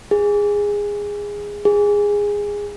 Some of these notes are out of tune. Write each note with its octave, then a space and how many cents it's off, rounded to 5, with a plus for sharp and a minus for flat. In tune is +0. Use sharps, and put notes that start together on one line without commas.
G#4 -15
G#4 -15